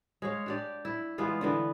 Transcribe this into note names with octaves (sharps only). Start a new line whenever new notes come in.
G#3 C#5 F5
D4 G4 D5
E4
E3 G#3 B3 F4
D3 E3 B3